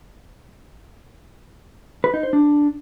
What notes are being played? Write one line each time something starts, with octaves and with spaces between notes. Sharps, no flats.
B4
D#4
C5
D4